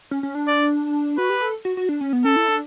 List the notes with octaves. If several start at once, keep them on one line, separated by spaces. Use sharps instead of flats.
C#4
C#4
D4
D5
F#4 B4
G4
A4
F#4
F#4
D4
C#4
B3
C#4 A4
E4
D4